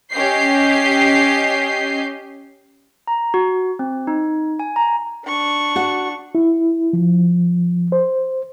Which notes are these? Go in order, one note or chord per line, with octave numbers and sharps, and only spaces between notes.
C#4 G4 D#5 G6 C7
A#5
F#4
C4
D#4
G#5
A#5
D4 C#6
F#4 F#5
E4
F3
C5